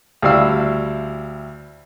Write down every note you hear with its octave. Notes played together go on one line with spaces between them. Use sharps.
D2 G3 E4 F5 E6